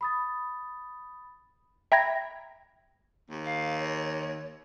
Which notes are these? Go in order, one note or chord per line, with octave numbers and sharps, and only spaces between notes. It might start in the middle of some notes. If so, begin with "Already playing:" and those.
B5 D#6 A6
E5 G5 A#5 B5 G#6 A#6
D#2
F5
C#5